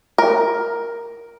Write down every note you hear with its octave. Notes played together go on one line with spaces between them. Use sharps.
A#4